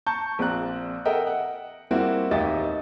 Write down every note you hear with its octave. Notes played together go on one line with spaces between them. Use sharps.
A5 A#5 C#6 G6
A#1 C4 D5 A#5 F#6
A4 A#4 D#5 E5 F#5 G5
F#5
G3 A#3 C4 E4 F#4
A1 D#2 G4 D#5 E5 A6